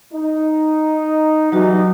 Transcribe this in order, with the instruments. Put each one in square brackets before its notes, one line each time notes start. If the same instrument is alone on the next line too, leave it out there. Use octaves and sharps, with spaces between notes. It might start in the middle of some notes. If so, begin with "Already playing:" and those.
[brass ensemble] D#4
[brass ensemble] E3 G3 D#4 [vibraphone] F#3 F#4